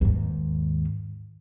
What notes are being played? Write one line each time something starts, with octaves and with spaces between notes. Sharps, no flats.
D#2 G#2